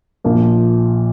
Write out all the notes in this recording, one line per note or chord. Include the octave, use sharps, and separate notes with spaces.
A#1 A#2 F3 A#3